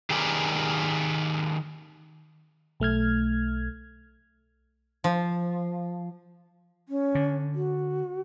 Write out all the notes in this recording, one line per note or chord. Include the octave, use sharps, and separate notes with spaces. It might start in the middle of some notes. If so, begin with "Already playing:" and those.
D#3 G4 G#4 A#4 B4 D5
B1 A3 F6 G#6
F3
C#4
D3
F#4